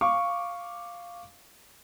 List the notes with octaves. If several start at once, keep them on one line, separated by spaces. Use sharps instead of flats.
F5 C#6 D6